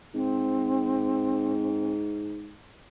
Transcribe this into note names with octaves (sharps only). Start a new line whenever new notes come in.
G#2 C4